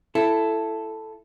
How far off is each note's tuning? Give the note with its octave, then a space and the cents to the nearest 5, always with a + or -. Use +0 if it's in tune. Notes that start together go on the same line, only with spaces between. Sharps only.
E4 +15 A4 +0